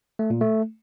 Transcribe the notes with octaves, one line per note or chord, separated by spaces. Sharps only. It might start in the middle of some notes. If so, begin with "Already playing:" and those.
A3
A#2
A3